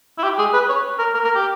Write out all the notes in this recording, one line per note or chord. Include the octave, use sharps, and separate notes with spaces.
E4
G4
G#4
B4
C#5
A#4
A#4
A#4
G4